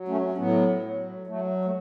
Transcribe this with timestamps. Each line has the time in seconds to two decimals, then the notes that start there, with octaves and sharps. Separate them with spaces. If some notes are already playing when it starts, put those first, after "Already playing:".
Already playing: F#3
0.08 A3 C#4
0.32 C#4
0.37 A2 F#3 B3
0.82 F#3
1.27 F#3 A3
1.65 A3